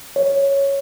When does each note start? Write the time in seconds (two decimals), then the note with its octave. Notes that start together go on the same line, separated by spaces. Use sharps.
0.16 C#5